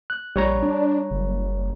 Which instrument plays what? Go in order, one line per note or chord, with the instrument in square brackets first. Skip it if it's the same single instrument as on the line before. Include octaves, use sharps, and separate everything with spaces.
[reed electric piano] F#6
[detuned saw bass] A#1 [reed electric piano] G3 C#5 A#5
[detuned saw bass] D4
F#1